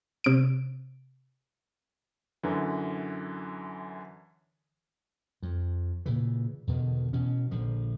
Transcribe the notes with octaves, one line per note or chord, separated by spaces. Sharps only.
C3 D7
F#2 D3 E3
F2
A#2 C#3 E3
E2 B2 D3 D#3
B2 E3 C#4
A#1 D3 F3